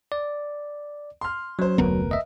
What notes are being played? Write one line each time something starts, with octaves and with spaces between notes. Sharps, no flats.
D5
C6 F6
F#3 C#4 C5
F1 D2 B3 A#4 B4
D#5 E5